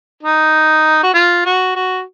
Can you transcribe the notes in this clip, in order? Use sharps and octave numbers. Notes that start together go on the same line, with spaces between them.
D#4
F#4
F4
F#4
F#4